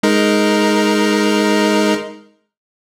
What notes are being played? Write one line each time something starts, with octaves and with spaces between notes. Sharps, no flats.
G#3 D#4 A#4